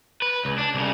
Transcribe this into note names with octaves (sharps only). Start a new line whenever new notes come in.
B4
C#2
D4
C2 C#3